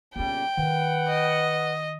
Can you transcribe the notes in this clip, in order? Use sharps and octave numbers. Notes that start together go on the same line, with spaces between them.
A#2 C#3 G3 B3 C#4 G5
D#3 B4 F#5
D#5